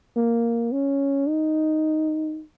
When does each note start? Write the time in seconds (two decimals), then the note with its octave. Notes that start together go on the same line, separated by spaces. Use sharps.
0.16 A#3
0.72 C#4
1.28 D#4